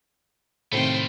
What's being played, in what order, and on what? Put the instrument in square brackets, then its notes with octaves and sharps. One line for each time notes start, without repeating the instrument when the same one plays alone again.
[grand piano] A2 C3 D#3 [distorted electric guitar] A3 F4 [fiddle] C5 G5